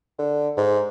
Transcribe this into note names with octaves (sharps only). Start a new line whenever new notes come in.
D3
G#2